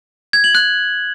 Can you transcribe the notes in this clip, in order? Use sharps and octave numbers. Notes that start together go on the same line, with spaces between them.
G#6
F#7
F#6